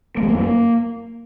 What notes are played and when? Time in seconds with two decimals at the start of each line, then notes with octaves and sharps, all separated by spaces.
0.17 A#3
0.23 G#3
0.28 A#3
0.34 F#2
0.40 A#3